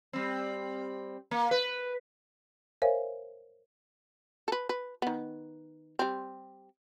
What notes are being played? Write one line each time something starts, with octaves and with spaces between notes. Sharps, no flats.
G3 C4
A#3
B4
A#4 C5 C#5 E5 F5 G#5
A4 B4
B4
D#3 B3
G3 C4